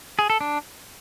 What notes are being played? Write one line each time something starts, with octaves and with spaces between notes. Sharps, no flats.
G#4
A4
D4